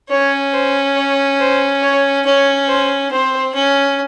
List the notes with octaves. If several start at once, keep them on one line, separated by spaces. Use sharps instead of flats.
C#4 C#5
C5
C#5
C5
C#5
C#4 C#5
C5
C4 C5
C#4